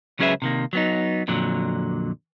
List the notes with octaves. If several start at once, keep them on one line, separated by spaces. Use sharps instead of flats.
C#2 F#3 C#4 G#4 B4 E5
C3 D#3 A#3
F#3 B3 D#4
F2 A#2 D3 F#3